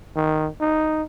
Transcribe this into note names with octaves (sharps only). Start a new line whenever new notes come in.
D#3
D#4